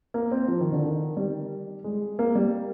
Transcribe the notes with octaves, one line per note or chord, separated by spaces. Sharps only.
A#3
C4
F3
D#3
D3
D#3
G3
G#3
A#3
G3